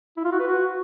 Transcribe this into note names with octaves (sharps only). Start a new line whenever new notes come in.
E4
F4
F#4
B4
F#4